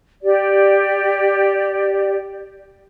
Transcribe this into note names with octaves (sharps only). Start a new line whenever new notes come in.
G4 D5